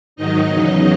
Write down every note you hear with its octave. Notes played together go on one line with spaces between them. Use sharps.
G#2 D#3 F#3 D#4 D#5
E2 C#3 F#3